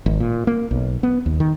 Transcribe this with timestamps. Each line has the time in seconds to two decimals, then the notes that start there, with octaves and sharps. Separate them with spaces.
0.06 G#1
0.20 A#2
0.47 A#3
0.71 B1
1.03 B3
1.26 D#2
1.40 D#3